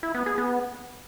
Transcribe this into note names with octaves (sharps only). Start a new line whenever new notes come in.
E4
B3
G#4
B3